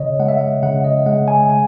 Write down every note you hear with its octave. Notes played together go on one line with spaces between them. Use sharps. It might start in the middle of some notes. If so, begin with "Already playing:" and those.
Already playing: C#3 C#5 D#5
G#3 F#5
E5
F#5
C#3 F#5
D#5
G#3 F#5
G#5
G#3 G#5